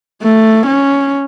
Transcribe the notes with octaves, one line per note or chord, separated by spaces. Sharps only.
A3
C#4